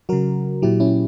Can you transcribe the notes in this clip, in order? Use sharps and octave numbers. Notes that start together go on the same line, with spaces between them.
C#3 F#3 F#4 A#4
A#2 F#3 E4 G4
C#4 E4